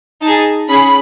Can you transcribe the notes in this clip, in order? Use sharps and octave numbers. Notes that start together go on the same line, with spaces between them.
D#4 G#4 A5
C#4 G#4 B5